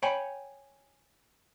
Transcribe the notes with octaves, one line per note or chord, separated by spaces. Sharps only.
C#5 G5 G#5 B5